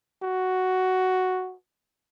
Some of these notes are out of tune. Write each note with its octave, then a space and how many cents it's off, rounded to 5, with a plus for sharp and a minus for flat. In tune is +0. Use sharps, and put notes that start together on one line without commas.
F#4 +5